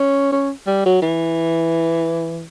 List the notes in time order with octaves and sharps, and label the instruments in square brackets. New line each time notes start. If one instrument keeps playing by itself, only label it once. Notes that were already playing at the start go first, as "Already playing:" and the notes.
Already playing: [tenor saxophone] C#4
C#4
G3
F#3
E3